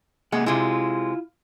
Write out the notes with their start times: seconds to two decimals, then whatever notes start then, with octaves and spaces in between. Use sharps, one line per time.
0.32 C3 G#3 A#3 F#5
0.46 C3 G#3 E4 F4